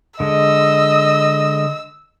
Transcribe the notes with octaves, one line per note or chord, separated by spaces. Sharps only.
D3 G#3 D#5 E6